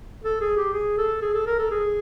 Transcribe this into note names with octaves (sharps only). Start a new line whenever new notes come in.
A4
G#4
G4
G#4
A4
G#4
A4
A#4
A4
G#4